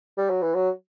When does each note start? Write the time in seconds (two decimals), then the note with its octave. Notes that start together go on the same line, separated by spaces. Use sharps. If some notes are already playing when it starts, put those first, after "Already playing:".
0.17 G3
0.30 F#3
0.42 E3
0.54 F#3